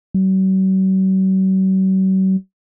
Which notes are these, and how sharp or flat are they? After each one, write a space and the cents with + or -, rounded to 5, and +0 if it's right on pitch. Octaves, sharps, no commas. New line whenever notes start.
F#3 +45